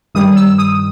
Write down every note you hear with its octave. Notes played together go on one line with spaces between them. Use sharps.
G2 D#3 G3 D#6
E6
D#6